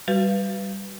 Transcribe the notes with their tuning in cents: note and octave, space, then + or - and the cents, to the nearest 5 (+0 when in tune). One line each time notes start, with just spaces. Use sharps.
G3 +0 F#4 +15 B4 +0